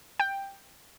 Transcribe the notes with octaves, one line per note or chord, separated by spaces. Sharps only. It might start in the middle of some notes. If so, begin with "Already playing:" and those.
G5